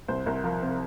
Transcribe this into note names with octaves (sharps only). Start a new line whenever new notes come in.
C2 C5
C2 A#4
F3 A#4
C3 C5